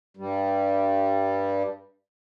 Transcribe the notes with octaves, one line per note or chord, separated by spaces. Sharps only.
G2 G3